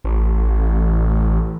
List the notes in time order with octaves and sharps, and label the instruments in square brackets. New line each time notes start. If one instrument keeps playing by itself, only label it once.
[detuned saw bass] A1